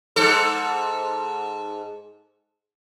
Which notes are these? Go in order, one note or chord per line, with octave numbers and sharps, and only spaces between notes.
G#2 A4